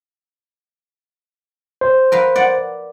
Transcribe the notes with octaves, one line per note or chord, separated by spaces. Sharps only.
C5
A#4 B4 F5
D5 F#5